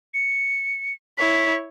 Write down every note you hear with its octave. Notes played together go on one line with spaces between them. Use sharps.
C#7
E4 C#5 B6